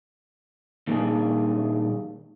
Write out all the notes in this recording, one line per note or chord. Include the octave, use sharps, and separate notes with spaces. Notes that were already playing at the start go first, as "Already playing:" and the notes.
A#2 D#3 G3 A#3 D4 G#4